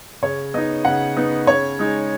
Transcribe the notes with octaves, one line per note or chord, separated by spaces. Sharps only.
C#3 C#5
B3 D#4 D#5
C#3 F#5
B3 D#4
C#3 C#5
G#3 D#4